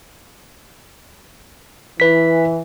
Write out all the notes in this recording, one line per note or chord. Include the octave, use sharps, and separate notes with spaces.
E3 B4 B6